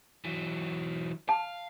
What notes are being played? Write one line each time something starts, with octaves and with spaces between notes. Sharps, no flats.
E3 F#3
F5 A5